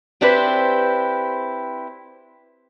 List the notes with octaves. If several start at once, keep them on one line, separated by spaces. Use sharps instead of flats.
C4 D4 E4 G4 B4 C5